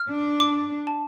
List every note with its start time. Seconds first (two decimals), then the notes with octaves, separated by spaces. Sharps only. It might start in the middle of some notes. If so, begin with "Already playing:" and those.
Already playing: F6
0.09 D4
0.40 D6
0.87 A5